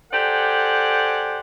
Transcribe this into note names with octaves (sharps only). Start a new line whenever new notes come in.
G4 A4 C5 D5 F#5 G#5